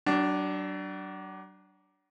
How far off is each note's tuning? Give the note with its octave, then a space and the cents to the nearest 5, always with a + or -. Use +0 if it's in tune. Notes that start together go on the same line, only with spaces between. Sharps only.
F#3 +40 D4 +0